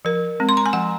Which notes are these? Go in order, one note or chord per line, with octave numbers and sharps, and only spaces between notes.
F3 A#4
G#3 C4
C6
A#5
G#5
F3 F#5